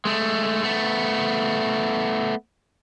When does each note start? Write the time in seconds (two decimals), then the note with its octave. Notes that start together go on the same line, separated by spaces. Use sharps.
0.05 G#3 A3
0.64 A3 B3